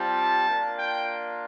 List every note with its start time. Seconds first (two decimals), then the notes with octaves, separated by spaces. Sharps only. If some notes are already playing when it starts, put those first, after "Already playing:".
Already playing: G3 C4 F4 A5
0.49 A#3 D4 F4
0.78 G5